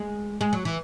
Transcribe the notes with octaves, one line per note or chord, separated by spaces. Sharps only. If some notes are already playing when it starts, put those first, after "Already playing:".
Already playing: G#3
G#3
F#3
E3